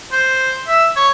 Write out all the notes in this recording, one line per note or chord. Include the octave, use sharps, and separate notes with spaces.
C5
E5
C#5